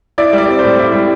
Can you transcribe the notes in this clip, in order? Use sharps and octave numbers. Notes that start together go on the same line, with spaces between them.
E4 D5
G3
D5
C4
A2 C5
E4
G3